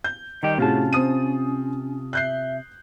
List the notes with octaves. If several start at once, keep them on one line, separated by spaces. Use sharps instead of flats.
G6
D#3 G3 G4 D#5
A2 C3 C#4 F4 F#4 G#4 A5
C4 D#6 D#7
E5 F#6 G6 C7